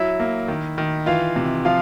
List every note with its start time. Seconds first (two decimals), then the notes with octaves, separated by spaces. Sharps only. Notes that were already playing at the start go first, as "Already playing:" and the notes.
Already playing: F#3 E4 E5
0.20 A#3
0.48 D#3
0.78 D#3
1.06 E3 F4 F5
1.36 C3
1.65 F3 F4 F5